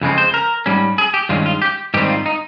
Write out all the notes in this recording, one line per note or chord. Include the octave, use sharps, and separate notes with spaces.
F2 C#3 G#3 C4
C5
A#4
G#2 G3 C#4
G#4
G4
G2 D#3 G#3 C#4 F4
F4
G4
G#2 D#3 G3 C4 G4
F4
D#4